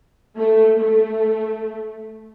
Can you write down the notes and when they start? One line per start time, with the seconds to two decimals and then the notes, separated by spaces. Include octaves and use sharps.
0.38 A3
0.80 A3